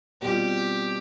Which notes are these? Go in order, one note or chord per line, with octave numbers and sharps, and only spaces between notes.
B2 G3 C4 F4 G4